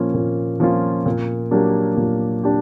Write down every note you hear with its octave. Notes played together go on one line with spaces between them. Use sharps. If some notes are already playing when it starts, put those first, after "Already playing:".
Already playing: A#2 F3 A#3 C#4 F4
A#2
F3 A#3 C#4 F4
A#2
F#3 A#3 D4 G4
A#2
D4 G4